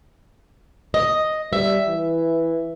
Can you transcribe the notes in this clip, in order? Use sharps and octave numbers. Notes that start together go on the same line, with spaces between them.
D#5
G3 E5
E3